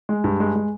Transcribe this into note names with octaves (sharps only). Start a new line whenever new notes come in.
G#3
G2
G#3
G#3